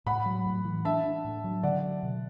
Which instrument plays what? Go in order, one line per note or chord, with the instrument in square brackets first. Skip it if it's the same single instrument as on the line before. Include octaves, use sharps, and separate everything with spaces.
[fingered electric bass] A2 [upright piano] F#5 B5
[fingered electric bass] F#3
A2
E3
[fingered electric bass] D4 [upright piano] E5 A5
[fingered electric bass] D4
A2
F#3
[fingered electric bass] D3 [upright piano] D5 F#5
[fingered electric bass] F#3
B2